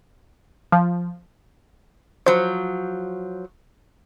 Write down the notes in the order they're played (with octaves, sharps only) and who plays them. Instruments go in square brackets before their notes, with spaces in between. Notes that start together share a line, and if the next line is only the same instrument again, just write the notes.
[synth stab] F3
[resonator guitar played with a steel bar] F3 F#3 [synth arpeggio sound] C5